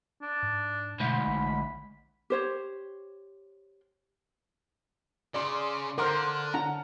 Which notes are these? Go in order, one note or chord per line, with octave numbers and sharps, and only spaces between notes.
D4
G#2
D2 G#2 B2 B5
A#1
G4 C5 C#5
C#3 D5 C6
D3 A#4 C5 F#5 C6 D6 F6
D3 C#4 F#5 A5 A#5